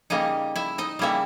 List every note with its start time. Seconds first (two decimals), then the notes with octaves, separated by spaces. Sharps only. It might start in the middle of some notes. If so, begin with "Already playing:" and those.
0.10 C#3 G3 A#3 D#4 D#5
0.56 E4 E5
0.78 D#4 D#5
0.99 C#3 G3 A#3 E4 E5